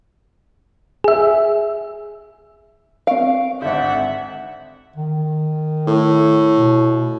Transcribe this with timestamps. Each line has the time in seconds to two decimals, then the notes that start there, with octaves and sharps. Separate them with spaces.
1.04 G#4 E5
3.07 C4 F5 C#6 D7
3.62 G#1 D3 E5 F#5 G6 C#7
4.96 D#3
5.88 A2
6.57 B2